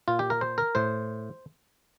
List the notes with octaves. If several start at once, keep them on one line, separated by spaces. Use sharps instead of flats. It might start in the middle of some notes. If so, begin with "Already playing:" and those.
A#2 F4
G4
A#4
C5
A#4
A2 C5